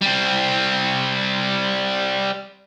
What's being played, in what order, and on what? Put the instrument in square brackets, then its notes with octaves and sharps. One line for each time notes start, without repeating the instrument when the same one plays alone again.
[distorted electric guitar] G3 C4